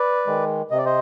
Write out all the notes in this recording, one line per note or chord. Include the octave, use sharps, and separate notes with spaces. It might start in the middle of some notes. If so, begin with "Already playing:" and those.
Already playing: B4 D5
D#3 G#3
C3 D#5
D5
C5 D#5